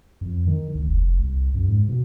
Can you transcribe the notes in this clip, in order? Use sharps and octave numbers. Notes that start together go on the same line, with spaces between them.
F2
D#3
D2
F1
C2
F#2
G#2
B2